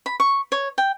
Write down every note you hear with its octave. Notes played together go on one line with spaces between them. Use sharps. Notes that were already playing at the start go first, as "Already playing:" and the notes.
B5
C#6
C#5
G5